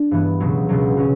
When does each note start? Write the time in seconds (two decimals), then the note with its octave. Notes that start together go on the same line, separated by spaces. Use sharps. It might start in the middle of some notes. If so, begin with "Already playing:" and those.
Already playing: D4
0.11 G2 E3 B3
0.40 C#2 B2 F#3
0.69 C#2 B2 F#3
0.97 B2 F#3 C#4